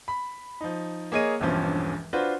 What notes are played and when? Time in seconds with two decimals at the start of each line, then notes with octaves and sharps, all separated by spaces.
0.08 B5
0.61 F3 D#4
1.12 A#3 G#4 C#5 D#5 D#7
1.40 E1 A#1 E2 G2 F3 C#4
2.13 D4 F4 F#4 B4 C5